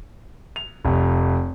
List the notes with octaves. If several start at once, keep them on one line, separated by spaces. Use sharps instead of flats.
F7
F1